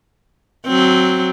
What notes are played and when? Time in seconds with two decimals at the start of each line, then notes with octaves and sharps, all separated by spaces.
0.67 F#3 C4